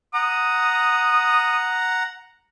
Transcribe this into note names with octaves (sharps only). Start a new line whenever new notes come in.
F#5 A#5 D#6